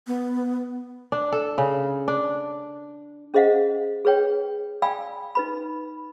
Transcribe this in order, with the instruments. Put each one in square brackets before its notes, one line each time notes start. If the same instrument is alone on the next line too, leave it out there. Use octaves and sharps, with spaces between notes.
[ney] B3
[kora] D4
A4
C#3
D4
[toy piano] C#4 G#4 C5 D#5 F5 F#5
G#4 B4 C#5 G5
D5 F5 G5 G#5 B5 E6
D#4 B4 B5